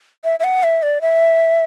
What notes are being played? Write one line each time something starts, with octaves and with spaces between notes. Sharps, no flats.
E5
E5
F#5
E5
D5
E5